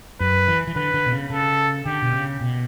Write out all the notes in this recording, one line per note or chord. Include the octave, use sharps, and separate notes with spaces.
F#2 B4
E3
E3
D3 B4
D3
B2
C#3
C#3 A4
D3 G4
B2
C#3
B2